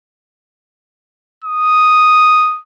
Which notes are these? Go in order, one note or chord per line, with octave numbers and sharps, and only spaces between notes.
D#6